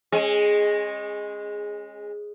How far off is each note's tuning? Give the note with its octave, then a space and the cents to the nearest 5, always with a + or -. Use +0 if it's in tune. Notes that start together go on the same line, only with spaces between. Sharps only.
G#3 -5 C#4 -35 G#4 +0